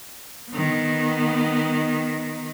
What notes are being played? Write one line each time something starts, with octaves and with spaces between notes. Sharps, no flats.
D#3 B3